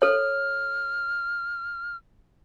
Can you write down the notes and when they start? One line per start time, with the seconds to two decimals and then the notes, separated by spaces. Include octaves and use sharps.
0.02 A4 C#5 F6